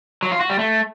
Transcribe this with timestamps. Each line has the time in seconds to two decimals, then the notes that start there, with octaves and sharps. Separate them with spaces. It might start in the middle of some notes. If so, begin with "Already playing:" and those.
0.23 F#3
0.32 F4
0.41 F#4
0.50 G3
0.59 A3